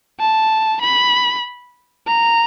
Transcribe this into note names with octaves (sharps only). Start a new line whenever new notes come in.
A5
B5
A#5